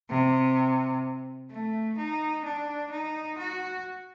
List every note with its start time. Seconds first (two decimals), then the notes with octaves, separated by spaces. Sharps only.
0.09 C3
1.50 A3
1.97 D#4
2.45 D4
2.92 D#4
3.38 F#4